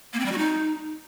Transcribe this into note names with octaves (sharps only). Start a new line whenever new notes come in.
A#3
C4
G3
F#4
D#4